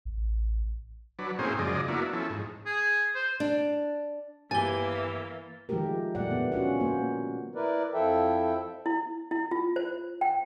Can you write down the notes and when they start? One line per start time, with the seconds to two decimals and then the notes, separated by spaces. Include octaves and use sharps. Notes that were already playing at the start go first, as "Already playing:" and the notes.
0.05 A1
1.19 F#3 D4 B4
1.39 A2 A#3 C4 C#4 G#4 C5
1.59 F#2 C#3 F3 G#3 D5 D#5
1.88 A#3 B3 D4 E4 F#4
2.13 F3 C#4 E4 A4
2.30 G#2
2.66 G#4
3.15 C5
3.40 D4
4.51 G1 E3 A#3 G4 G#5 A6 G7
5.69 D#3 F3 G#3 A3 G4 A#4
6.15 A#2 G3 A3 D5 F#5
6.31 D3 B3
6.52 C#4 F4 F#4 F#5
6.80 A#3 C5
7.55 E4 A#4 B4 D5
7.94 F2 F3 E4 A4 E5 G5
8.86 E4
9.31 E4
9.51 F4
9.76 C5
10.21 G5